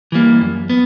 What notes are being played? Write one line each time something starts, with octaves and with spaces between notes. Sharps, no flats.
E3 G3 A#3
F#2
B3